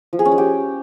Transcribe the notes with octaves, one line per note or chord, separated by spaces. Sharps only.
F3
G#4
C#4
G#3
G4